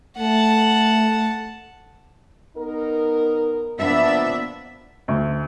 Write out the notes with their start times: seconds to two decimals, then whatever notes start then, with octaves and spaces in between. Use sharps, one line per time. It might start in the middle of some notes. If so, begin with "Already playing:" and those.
0.18 A3 F#5 A5
2.57 B3 D#4 A#4
3.79 F3 A#3 B3 D4 E5
5.08 D2